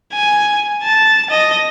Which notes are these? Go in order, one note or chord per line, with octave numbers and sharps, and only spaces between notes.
G#5
A5
D#5